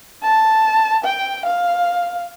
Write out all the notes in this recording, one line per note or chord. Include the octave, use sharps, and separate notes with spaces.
A5
G5
F5